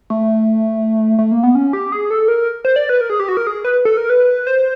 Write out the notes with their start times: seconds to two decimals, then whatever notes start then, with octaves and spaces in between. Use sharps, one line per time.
0.10 A3
1.19 A3
1.31 A#3
1.43 B3
1.55 C#4
1.73 G4
1.92 G#4
2.10 A4
2.28 A#4
2.65 C5
2.76 D5
2.89 B4
3.01 A#4
3.10 G#4
3.20 G4
3.28 F#4
3.37 A#4
3.47 G#4
3.64 B4
3.85 A4
3.97 A#4
4.10 B4
4.47 C5